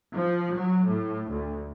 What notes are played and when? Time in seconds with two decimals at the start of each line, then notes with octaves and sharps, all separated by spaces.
0.15 F3
0.55 F#3
0.88 A2
1.30 D2